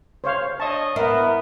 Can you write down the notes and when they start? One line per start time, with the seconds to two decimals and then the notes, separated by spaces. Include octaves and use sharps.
0.24 C5 C#5 F5
0.60 D4 C#5 D#5 A5
0.96 B3 E4 A#4